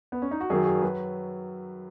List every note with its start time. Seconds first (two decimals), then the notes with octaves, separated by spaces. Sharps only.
0.12 B3
0.22 C#4
0.31 D#4
0.40 F#4
0.50 F#2 D#3 F#3 G#4
0.66 G#4
0.82 F#3 B4